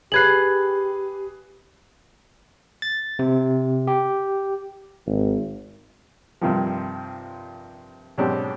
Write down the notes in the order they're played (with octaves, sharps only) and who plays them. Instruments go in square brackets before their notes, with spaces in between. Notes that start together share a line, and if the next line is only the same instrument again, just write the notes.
[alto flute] G4 [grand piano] G#4 B4 C7 [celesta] F#6 G#6 F#7
[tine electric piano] A6
C3
G4
[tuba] G#1
[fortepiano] G2 C3 D#3 F3
G#2 B2 F#3 C4 D4 G4